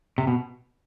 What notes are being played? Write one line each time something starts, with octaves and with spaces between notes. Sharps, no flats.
C3
B2